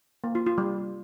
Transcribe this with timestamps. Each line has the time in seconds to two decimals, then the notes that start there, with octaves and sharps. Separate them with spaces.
0.24 A#3
0.35 F4
0.46 F4
0.58 G3